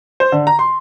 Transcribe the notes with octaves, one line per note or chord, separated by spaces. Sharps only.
C5
D3
A#5
C6